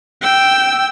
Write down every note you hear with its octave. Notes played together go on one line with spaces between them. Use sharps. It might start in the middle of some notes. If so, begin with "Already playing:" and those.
G5 E6